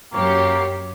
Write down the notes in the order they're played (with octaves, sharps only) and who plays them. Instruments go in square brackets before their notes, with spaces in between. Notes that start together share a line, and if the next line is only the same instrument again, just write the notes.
[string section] F#2 G4 [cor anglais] A#3 [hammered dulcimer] C#5